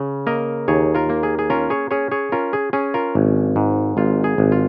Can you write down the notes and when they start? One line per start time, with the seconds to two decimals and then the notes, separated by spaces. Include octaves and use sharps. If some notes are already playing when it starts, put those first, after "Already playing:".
Already playing: C#3
0.27 A#3 A#4 D#5
0.68 D#2 G#4 C#5
0.95 F4 A#4
1.09 A#3
1.23 G#4
1.39 G#4
1.50 C#4 F4 A#4
1.70 G#4 C#5
1.91 C#4 G#4 C#5
2.11 G#4 C#5
2.32 C#4 F4 A#4
2.53 G#4
2.73 C#4 G#4
2.94 F4 A#4
3.15 G#1
3.56 G#2
3.97 G#1 F4
4.24 G#4
4.38 G#1
4.52 F4